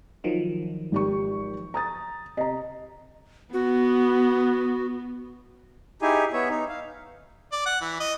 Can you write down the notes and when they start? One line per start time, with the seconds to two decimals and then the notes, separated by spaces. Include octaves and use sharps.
0.24 D#3 F3 F#3
0.92 G#1 G4 C#6
1.74 A#5 D#6 A6
2.37 C3 D#5 A#5
3.53 B3 F#4
6.02 D#4 E4 G4 G#4 G#5
6.33 B3 C#5 E5
6.50 D#4
6.69 F5
7.52 D5
7.66 F#5
7.81 E3
8.00 D#5